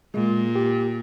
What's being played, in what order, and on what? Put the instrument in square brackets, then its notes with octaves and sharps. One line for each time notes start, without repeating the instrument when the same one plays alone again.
[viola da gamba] A#2 [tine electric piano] G#3
[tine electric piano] G4